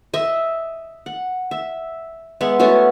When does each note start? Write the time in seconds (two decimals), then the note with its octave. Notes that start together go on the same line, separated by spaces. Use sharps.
0.14 D#5 E5
1.06 F#5
1.51 E5
2.41 G#3 B3 E5 F#5
2.59 A3 B3 C#4 F#4